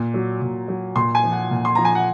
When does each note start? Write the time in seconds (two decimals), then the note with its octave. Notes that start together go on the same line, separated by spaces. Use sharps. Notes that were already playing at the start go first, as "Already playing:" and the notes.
Already playing: A#2
0.14 F#3
0.42 A#2
0.68 F#3
0.96 A#2 C6
1.15 G#5
1.24 F3
1.32 F#5
1.51 A#2
1.65 C6
1.75 F3 A#5
1.85 G#5
1.95 F#5